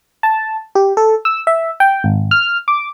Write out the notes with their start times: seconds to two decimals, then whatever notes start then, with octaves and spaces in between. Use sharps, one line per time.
0.23 A5
0.75 G4
0.97 A4
1.25 E6
1.47 E5
1.80 G5
2.04 G#1
2.31 F6
2.68 D6